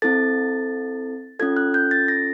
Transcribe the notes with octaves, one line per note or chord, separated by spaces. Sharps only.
C4 E4 A4 A6
C#4 F4 A4 G#6
F#6
G6
A6
A#6